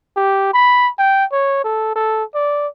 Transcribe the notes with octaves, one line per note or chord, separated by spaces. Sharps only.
G4
B5
G5
C#5
A4
A4
D5